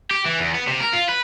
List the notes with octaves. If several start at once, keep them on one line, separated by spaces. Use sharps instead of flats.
G4
E3
E2
B3
C3
A#4
F4
B4